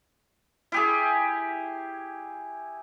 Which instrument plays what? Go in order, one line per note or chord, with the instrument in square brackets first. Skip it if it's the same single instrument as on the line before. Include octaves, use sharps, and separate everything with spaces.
[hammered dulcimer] E4 G4 G#4